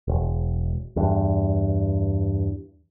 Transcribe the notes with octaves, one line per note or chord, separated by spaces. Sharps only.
E1
E2 G2